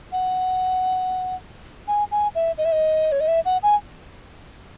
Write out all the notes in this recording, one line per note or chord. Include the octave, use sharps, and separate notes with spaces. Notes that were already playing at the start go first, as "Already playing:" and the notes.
F#5
G#5
G#5
E5
D#5
E5
D#5
C#5
D#5
E5
F#5
G#5